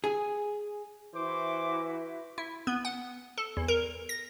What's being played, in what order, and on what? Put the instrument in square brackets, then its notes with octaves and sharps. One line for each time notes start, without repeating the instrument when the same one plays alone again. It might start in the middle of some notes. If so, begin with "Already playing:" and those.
[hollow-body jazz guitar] G#4
[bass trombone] E3 [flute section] E4 F#4 E5 [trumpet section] C5 D6
[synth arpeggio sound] E4
B3
F#5
A4
E2
A#4
A#6